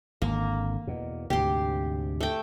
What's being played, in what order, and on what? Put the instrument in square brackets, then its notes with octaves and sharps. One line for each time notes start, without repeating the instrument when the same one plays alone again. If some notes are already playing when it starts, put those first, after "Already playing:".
[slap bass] G#1 D3 [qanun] A#3
[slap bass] E2 B2
[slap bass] D2 G#2 C3 [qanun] G4 C6
[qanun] A3 G5